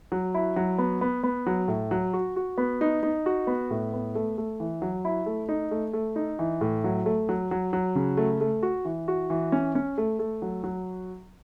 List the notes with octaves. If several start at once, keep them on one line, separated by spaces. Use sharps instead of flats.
F#3
E4
F#3
B3
B3
B3
F#3
A2
F#3
F#4
F#4
B3
D#4
D#4
F#4
B3
A2
B3
A3
A3
E3
F#3
E4
A3
D#4
A3
A3
D#4
E3
A2
F#3
A3
F#3
F#3
F#3
C#3
A3
A3
F#4
E3
F#4
E3
C#4
C#4
A3
A3
F#3
F#3